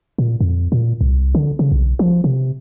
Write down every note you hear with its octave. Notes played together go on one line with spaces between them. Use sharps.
A#2
F2
A#2
C2
D3
C#3
B1
F3
C3